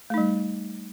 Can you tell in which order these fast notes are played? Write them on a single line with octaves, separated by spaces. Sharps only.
A3 D#4 G3